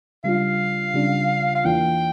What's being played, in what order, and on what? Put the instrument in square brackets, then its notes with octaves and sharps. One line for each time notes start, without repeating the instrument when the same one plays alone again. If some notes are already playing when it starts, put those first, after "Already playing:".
[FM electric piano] C#3 G3 D4 F4 [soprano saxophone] F5
[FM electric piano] C#3 G3 D4 F4
[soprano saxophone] F5
[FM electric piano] E2 E3 A#3 D4 F4 [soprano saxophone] G5